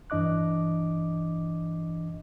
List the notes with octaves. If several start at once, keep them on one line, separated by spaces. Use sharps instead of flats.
G2 E3 D4 D#5 D6 F#6